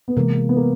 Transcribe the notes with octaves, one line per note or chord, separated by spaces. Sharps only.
B3
C3 E3 G#3 A#3
B3
A#3